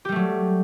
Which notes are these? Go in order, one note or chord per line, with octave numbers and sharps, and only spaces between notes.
F#3 G3 A3 G4